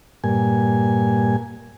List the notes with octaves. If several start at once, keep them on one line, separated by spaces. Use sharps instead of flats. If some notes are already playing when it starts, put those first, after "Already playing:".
G2 A#2 G#5